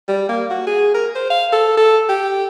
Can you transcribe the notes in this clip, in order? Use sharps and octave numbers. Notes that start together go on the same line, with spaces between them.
G3
A#3
F#4
G#4
A#4
C5
F5
A4
A4
G4